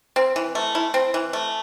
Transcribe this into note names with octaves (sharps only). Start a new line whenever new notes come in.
C4
E3
A3
E4
C4
E3
A3